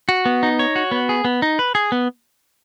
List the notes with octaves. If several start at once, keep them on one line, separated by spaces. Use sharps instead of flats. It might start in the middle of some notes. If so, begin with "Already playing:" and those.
F#4
B3
D#4
C#5
F#4
B3
G#4
B3
D#4
B4
G#4
B3